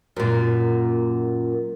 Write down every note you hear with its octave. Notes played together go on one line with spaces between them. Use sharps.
F#2 A#2